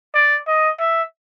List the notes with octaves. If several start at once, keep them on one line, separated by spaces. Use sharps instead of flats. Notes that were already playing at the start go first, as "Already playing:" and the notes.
D5
D#5
E5